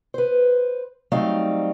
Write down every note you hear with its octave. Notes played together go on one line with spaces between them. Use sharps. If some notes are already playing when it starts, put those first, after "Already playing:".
B4 C5
F#3 G3 A3 C4 D#4 F5